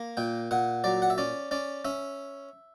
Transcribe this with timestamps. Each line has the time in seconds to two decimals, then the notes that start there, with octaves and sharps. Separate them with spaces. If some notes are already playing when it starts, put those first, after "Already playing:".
Already playing: A#3
0.17 A#2 G5
0.51 A#2 F#5
0.84 F#3 D5
1.02 F#5
1.10 E5
1.18 C#4 D5
1.51 C#4 D5
1.85 C#4 E5